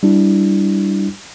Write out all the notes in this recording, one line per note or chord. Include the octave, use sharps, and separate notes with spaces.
G3 D4 E4